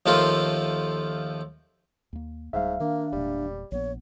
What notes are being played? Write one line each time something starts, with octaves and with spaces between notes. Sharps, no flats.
D#2 F3 A3 F4 A#4
D#2 A#3
D1 G#2 G3 E5 F5
D#3 A#3 D4
E1 A#2 G3
A#1 B3 C#5